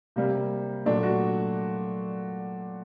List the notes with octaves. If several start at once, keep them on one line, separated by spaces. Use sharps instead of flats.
C3 G3 A#3
A#2 F#3 A3 D4
F#4